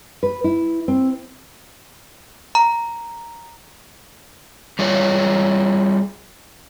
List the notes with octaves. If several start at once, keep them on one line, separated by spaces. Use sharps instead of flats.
B4
E4
C4
A#5
G3 F4 G#4 C#5